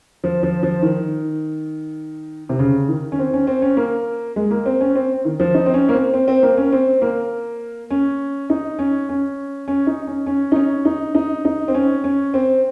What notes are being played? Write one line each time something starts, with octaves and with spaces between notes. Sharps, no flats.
F3
F3
F3
D#3
C3
C#3
D#3
C#4
C4
C#4
C4
C#4
A#3
G#3
A#3
C4
C#4
C4
D#3
F3
D#4
C4
C#4
A#3
C4
C4
C4
A#3
C#4
C4
A#3
C#4
D#4
C#4
C#4
C#4
D#4
C#4
C#4
D#4
C#4
D#4
D#4
D#4
C4
C#4
C#4
C4